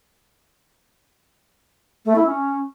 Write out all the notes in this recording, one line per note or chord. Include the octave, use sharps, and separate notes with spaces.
A3
E4
C#4